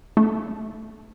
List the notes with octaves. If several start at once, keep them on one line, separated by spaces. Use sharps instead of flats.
A3